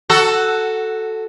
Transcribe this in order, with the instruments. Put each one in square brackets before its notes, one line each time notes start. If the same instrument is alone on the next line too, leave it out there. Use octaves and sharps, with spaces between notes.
[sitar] F#4 A4